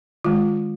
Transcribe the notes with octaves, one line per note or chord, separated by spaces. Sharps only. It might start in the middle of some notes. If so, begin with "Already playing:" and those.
D#3 G#3 F4